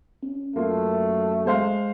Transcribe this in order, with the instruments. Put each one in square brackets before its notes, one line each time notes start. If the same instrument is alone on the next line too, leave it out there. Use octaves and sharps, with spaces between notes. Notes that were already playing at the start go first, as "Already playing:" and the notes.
[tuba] C#4
[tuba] F#2 [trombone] A3 [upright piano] A#3 F4
[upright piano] G#3 C5 F5